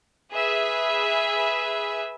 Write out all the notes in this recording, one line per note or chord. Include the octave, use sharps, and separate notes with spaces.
G#4 B4 E5